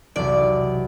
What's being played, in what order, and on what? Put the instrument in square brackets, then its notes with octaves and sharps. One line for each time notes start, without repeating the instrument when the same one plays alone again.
[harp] B1 E2 C3 [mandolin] D5